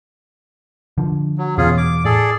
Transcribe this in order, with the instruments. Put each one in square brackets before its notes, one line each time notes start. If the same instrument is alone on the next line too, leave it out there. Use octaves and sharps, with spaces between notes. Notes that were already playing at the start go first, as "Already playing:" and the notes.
[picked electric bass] D3 F3
[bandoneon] F#3
[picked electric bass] E2 B2 [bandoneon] C#4 F4 G#4
[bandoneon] D6
[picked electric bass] A2 [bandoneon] G#4 A4 D5